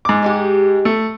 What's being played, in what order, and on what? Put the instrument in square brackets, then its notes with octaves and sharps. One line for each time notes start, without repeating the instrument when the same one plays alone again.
[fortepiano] G#2 D6
[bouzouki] G#3 D#4 G4
[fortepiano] A3